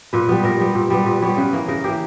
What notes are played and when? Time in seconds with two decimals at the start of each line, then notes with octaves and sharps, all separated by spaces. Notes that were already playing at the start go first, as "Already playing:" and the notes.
0.13 A#2 B4
0.29 G3 B3 B4
0.43 A#2 A#4
0.60 G3 B3
0.75 A#2
0.90 G3 B3
1.06 A#2 B4
1.22 G3 B3 C#5
1.37 C#3 B4
1.53 E3 A#3
1.68 C#3 A#4
1.84 E3 A#3 G4